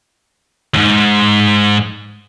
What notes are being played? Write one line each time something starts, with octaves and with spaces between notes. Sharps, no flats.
D#2 G#2